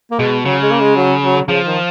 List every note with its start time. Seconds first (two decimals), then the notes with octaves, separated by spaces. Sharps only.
0.11 A#3
0.19 B2 G#3
0.45 C#3 F#3
0.62 G#3
0.71 A#3
0.80 G#3
0.96 F#3
1.23 F#3
1.48 C#3 F3
1.66 D#3